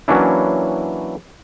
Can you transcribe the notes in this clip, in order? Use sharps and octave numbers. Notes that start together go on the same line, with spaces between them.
E3 F#3 A#3 C#4 D4 E4